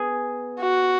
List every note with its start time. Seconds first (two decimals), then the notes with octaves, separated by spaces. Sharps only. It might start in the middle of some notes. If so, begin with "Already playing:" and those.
Already playing: B3 G#4
0.60 F#4